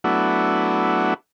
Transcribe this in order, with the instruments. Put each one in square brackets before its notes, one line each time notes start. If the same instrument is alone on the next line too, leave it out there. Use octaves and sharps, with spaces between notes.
[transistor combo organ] F#3 A3 B3 D4 E4 F#4